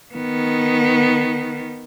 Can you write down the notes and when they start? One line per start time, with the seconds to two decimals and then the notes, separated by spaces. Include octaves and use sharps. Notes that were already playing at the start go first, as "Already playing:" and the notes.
0.14 D#3 B3